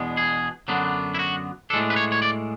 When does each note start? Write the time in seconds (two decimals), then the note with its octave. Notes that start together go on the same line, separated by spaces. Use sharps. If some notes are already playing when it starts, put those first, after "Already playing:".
Already playing: E2 B2 G#3 B3 D4
0.17 G#4
0.68 F#2 D3 F#3 B3 D4
1.14 E4
1.19 F#4
1.70 D4 A4
1.73 A2 G#3
1.90 B4
1.96 C#5
2.12 C#5
2.22 D5